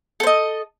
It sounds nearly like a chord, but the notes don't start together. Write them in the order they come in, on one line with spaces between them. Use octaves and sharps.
A4 C5 D#5